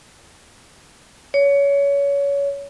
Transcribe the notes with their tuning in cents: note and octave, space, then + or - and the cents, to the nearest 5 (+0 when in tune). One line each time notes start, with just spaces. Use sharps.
C#5 +25